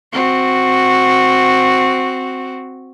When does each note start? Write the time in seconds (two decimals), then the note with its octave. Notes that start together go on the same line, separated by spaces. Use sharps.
0.13 C4 F#4